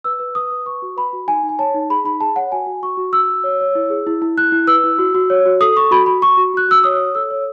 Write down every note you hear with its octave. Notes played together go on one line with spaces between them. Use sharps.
B4 E6
B4
B4 D#6
B4
B4 C#6
F#4
B4 B5
F#4
D#4 G#5
D#4
G#5
C#5 A5
D#4
G#4 B5
D#4 B5
G#4 A5
C#5 F#5
F#4 G#5
F#4
F#4 C#6
F#4
F#4 E6
F#4
C#5
C#5
E4
G#4
E4
E4
E4 F#6
E4
B4 E6
E4
F#4
F#4
C#5
F#4
A4 D#6
A4 C#6
F#4 B5
F#4 B5
F#4 C#6
F#4
F#4 F#6
F#4 E6
C#5 D#6
C#5
A4 E6
C#5